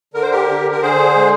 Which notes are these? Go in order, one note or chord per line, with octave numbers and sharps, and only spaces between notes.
D3 A#4
C5
G4 A#4
D3
A#4
D3 G#4 C5
G#3